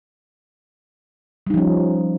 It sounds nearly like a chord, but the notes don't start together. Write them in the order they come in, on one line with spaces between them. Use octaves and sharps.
G3 D#4 F3 C#4